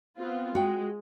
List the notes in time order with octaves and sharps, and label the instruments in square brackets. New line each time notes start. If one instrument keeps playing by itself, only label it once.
[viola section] B3 C4 F4
[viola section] G#3 [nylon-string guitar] F#4 G5